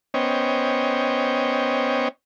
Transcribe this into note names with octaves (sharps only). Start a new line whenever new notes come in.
B3 C#4 C5 C#5 D#5 G5